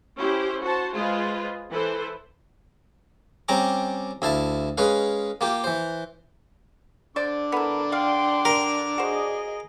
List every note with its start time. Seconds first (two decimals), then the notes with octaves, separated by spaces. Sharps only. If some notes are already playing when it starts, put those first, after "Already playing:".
0.19 C#4 E4 G4 C5
0.62 F#4 C5 A5
0.96 G#3 F4 G#4 B4 C5
1.71 E3 E4 A4 B4 C5
3.48 G3 C4 C#4 A#5 D6
4.22 D2 E4 F5 A5
4.78 G#3 C#4 B4 F5
5.41 A#3 F4 G4
5.64 E3 C5
7.16 D3 D4 C5 D5 D6
7.52 B3 E4 A4 A#4
7.92 D5 F5 G5 C6
8.45 G4 A#4
8.98 F#4 G#4 C5 D#5